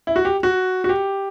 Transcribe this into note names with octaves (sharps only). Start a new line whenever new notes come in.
E4
F#4
G4
F#4
F#4
G4